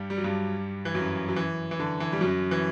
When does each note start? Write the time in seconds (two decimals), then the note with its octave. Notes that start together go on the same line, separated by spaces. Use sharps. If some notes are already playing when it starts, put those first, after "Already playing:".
Already playing: G2 G3
0.10 G3
0.18 F#3
0.24 G2 G3
0.85 E3
0.95 F#2 F#3
1.29 F#3
1.36 E3
1.71 E3
1.80 D3
2.00 E3
2.13 G3
2.21 F#2 F#3
2.51 E3